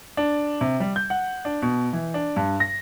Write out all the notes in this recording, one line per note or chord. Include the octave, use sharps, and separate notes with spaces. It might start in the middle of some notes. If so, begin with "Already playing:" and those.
D4
C3
G3
G6
F#5
D4
B2
E3
D4
G2
A#6